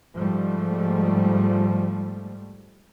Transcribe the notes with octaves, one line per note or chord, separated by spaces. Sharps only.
G#2 F3 G3 A3